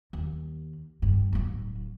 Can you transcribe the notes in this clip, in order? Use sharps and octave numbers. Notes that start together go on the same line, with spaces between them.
D#2
G2
D1 F#3